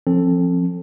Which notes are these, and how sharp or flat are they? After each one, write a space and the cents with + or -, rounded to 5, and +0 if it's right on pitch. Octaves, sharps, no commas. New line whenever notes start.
F3 +0 C4 +35 A4 +0